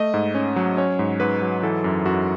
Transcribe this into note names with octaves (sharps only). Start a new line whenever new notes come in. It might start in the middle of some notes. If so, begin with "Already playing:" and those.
Already playing: A3 D#5
G#2
C#4
F#3
C#4 C#5
G#2
G#2 B4
F#3
E3 A4
F#2
F#2 F#4